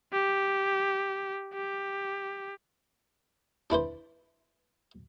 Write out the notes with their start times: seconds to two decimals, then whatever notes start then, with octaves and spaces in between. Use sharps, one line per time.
0.13 G4
1.53 G4
3.70 D4 E4 B4 C5